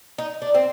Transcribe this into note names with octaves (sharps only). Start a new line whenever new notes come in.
D#4
D4
C4